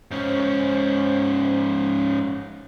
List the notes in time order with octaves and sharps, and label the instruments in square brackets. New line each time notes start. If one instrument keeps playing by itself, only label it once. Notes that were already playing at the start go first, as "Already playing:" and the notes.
[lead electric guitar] G#2 C#4 [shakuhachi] C5